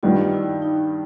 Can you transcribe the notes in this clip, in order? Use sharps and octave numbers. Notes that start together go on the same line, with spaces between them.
G2 D#3 G3 B3 F4
E4
D#4
D#4